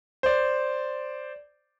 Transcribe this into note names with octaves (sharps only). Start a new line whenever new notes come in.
C5 D5